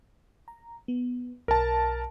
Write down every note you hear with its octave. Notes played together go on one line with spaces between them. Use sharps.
A#5
B3
B1 A#4 A5